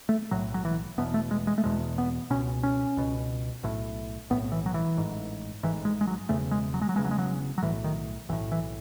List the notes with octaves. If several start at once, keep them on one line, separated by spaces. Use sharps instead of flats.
A3
B1 A2 F#3
F#3
E3
E1 E2 B2 B3
A3
G#3
G#3
A3
E1 E2 B2 G#3
B3
C#2 B2 C#4
C#4
C#2 B2
B1 A2
B1 A2 B3
E3
F#3
E3
A1 G#2
A1 G#2 E3
G#3
G#3
F#3
E1 E2 C#3 A3
G#3
F#3
G#3
F#3
E1 E2 C#3 G#3
F#3
G#3
F#3
F#3
B1 A2 E3
D#3
B1 A2 E3
E3